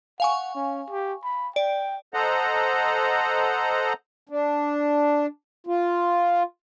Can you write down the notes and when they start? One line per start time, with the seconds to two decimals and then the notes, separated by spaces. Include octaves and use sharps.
0.20 F5 F#5 G#5 C#6
0.55 C#4
0.90 G4
1.23 B5
1.56 D5 G5
2.14 A4 C5 D#5 F#5 A#5
4.29 D4
5.67 F4